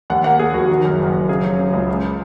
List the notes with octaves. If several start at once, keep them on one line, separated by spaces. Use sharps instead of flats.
D#2 F#5
A#3 F#5
A#3 G#4
D#2 F#4
D#3
F#2
F#1
F#2
C#3 G#4
F#3
C#3
C#2
G#3